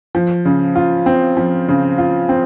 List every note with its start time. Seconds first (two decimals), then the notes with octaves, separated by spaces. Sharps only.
0.15 F3
0.45 C#3
0.75 F4
1.06 C4
1.37 F3
1.68 C#3
1.98 F4
2.29 C4